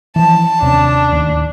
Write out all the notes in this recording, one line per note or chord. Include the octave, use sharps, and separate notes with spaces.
E3 F3 A5
D#2 C3 C#4 D4
D1 D#2